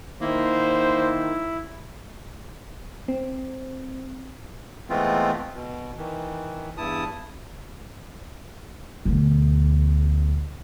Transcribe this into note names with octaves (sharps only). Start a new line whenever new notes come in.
D#3 A#3 E4 C5
C4
E3 G#3 A3 B3 C4 F4
B2
D#3 E3
E2 G2 E4 A5 D#6
D2 B2